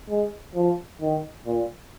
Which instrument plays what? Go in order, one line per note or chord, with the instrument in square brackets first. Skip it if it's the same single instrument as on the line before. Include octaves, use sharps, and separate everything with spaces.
[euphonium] G#3
F3
D#3
A#2